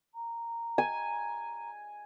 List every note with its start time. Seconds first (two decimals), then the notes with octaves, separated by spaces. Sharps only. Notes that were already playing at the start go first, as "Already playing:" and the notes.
0.15 A#5
0.78 G#5